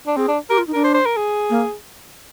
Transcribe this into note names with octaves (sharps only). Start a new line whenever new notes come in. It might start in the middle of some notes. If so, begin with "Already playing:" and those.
D4
C4 G#4
D4
G4 A#4
F4
D#4
D4 A#4
C5
C5
A#4
G#4
A#3